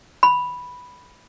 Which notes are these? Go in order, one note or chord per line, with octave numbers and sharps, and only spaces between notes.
B5